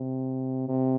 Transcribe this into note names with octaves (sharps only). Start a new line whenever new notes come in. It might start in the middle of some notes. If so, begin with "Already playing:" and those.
Already playing: C3
C3